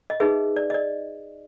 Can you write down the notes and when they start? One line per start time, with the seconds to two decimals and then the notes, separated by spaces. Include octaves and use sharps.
0.10 D#5
0.20 D#4 G#4 B4 E5
0.56 D5
0.70 D#5
0.74 D5